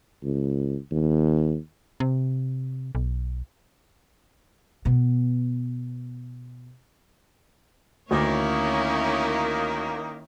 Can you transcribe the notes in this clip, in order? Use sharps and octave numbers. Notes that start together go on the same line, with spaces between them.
C#2
D#2
C3
B1
B2 B3
D2 D#3 A#3 C#4 E4 C#5 D6